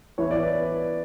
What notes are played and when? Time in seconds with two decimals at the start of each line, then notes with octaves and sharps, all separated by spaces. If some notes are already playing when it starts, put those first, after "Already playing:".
0.18 E3 B3 E4 C#5
0.31 D5
0.43 B4